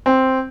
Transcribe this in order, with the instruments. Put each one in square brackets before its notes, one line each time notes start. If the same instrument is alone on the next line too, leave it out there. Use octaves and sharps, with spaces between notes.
[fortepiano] C4